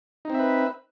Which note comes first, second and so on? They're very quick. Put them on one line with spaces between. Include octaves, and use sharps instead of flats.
D#4 C4 E5 B4